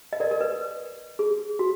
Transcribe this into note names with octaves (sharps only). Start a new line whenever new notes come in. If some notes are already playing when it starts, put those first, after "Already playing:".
D#5
A#4 D5
A#4
B4
G#4
F#4